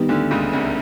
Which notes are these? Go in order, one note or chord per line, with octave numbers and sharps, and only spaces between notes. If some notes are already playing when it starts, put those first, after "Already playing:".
Already playing: D#3 G3 B3
D2 D3
C#2 C#3
C2 C3